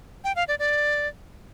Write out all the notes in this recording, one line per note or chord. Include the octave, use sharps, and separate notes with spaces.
G5
F5
D5
D5